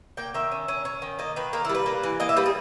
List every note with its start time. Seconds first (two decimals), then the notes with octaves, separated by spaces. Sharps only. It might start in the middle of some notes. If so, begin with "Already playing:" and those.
0.17 A#3 G5
0.34 D#3 E5
0.52 C#4
0.68 C#4
0.85 C#4
1.02 D#3
1.19 A#3 D#5
1.36 D#3 B4
1.53 A#3 A#4
1.65 E4
1.69 G3
1.75 B4
1.86 A#3
2.03 E3
2.20 A#3 D#5
2.29 E5
2.37 G3 B4
2.46 G#4